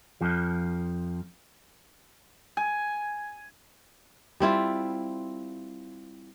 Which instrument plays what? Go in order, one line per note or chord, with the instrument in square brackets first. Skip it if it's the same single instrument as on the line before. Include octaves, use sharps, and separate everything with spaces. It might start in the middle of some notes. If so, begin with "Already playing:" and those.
[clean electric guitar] F2 F3
[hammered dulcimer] G#5
[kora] G3 C4 E4 F4